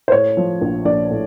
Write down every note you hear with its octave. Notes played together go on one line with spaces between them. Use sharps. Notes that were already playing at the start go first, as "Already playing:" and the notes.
C5
A2 C#5
F3
A#1
A#1 D5
A2